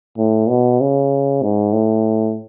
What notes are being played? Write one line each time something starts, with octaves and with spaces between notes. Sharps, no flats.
A2
B2
C#3
G#2
A2